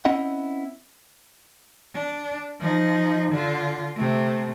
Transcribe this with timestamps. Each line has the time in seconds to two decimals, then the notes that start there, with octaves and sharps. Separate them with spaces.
0.05 C4 C#4 E4 D#5 F#5
1.94 D4
2.60 F3 D#4
3.32 D3 F4
3.95 C3 A3